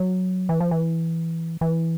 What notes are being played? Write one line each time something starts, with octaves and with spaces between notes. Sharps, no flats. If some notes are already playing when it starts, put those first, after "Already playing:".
Already playing: F#3
E3
F3
E3
E3